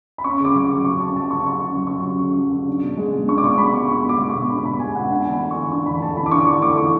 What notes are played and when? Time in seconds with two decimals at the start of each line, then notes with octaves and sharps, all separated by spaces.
0.18 B5
0.24 C#4 C#6
0.40 C#3 D6
0.54 F#3
0.65 D6
0.71 C#3
0.85 C#4 C#6
1.00 C#3 A5
1.16 F#3 A5
1.31 C#3 C#6
1.46 C#4 C#6
1.61 C#3
1.76 F#3
1.87 C#3 C#6
2.06 C#4
2.22 C#3
2.37 F#3
2.52 C#3
2.68 D4
2.83 B2
2.97 G#3
3.14 B2
3.28 D4 C#6
3.38 D6
3.43 B2 C#6
3.58 G#3 B5
3.74 B2 C#6
3.89 D4 C#6
4.04 B2 D6
4.20 G#3
4.30 B2 C#6
4.50 D4 B5
4.65 B2 B5
4.80 G#3 G#5
4.95 B2 F#5
5.10 D4 G#5
5.25 E3
5.31 B5
5.41 A3
5.51 C#6
5.56 E3
5.71 D4 C#6
5.86 E3 B5
6.01 A3 A5
6.17 E3 B5
6.26 D6
6.31 D4 C#6
6.40 D6
6.47 E3 C#6
6.62 A3 D6
6.77 E3 C#6